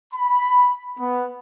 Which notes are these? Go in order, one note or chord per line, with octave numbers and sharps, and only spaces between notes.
B5
B3